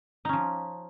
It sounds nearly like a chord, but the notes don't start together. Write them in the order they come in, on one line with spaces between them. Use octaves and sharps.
D#4 C#4 F3